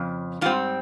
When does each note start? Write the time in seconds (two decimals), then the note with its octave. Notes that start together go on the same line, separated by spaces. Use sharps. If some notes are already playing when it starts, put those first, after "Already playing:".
Already playing: F2 C#3
0.41 G#2 G3 C4 F4